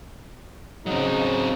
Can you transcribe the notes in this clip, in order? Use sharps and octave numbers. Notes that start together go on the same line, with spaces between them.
C#3 F#3 C4 D#4